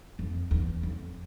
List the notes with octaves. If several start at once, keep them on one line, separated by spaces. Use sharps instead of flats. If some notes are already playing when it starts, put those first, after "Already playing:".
F2
E2
F2